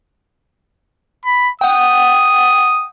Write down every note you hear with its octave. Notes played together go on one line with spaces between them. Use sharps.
B5
F#5 G5 D#6